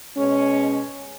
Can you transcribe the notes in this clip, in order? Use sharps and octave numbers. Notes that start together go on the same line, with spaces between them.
B2 G#3 C#4